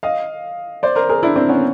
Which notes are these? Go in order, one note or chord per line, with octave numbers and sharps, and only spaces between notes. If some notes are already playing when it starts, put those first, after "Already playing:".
D#5 F5
C5 D5
A#4 C5
G#4 A#4
D4 E4
C4 D4
B3 C#4